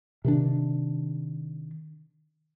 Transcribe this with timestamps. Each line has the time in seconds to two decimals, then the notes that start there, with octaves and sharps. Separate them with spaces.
0.25 C3 D#3 D4